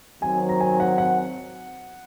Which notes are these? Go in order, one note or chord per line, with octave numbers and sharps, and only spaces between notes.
D#3 F#3 C4 G#5
A#5
G#5
F#5
F#5